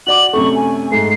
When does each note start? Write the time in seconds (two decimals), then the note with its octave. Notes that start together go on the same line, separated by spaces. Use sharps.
0.07 F#4 D5 D6 F#7
0.33 F#2 C3 A3 C#6
0.55 G#5
0.92 G#2 A3 C7